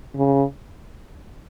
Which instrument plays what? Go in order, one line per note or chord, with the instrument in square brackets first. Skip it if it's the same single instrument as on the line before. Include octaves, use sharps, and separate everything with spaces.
[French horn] C#3